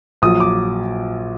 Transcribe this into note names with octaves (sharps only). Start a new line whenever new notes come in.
A#1 A#2 F#3 D#6
D6